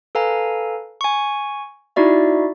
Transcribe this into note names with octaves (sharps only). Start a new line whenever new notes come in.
A4 B4 F5 G#5 A#5
G#5 C#6
D#4 E4 F#4 D5 E5